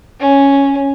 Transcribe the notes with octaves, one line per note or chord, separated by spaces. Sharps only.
C#4